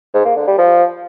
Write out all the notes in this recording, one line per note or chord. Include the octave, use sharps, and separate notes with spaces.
G#2
A#3
D3
G3
F3